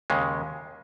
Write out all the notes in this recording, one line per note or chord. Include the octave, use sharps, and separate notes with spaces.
D#2 C#3 G#3